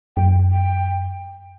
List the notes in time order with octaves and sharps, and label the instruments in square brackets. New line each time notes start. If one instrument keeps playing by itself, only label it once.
[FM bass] F#2 [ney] G5
[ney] G5